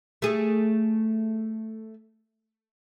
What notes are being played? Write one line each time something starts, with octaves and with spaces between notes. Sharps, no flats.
A3 G#4